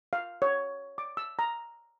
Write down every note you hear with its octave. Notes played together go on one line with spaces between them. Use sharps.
F5
C#5
D6
E6
A#5